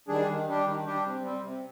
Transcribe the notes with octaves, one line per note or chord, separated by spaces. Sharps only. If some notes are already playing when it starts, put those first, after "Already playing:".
D#3 G3 D4 G#4
D#3
G3 D4 G4
D#3
G3 D4 G4
C3
G3 C4
C3